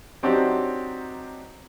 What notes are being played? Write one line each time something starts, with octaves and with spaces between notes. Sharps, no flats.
F#3 C4 D4 D#4 F#4 G4